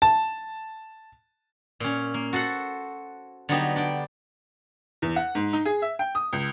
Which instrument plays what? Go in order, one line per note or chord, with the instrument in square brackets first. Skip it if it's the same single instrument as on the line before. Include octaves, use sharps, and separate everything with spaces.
[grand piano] A5
[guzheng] A#2 C#4
A#3
F#4 A4 C5 F#5
D3 F#3 G3 B3 D#4 G4
D4 G5
[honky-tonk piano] E2
F#5
G#2
D#4
G#4
E5
G5
D#6
C#2